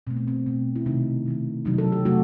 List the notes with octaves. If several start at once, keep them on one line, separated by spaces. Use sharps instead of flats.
B2 A3 C4
B3
C4
B2 A3
E4
C3 D#3 A3 D#4
C3 D#3 A3
C3 F#3 A3 D#4
A4
G4
C3 F#3 A3 F#4